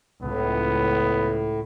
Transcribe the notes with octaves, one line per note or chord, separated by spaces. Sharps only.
C#2 A2 B3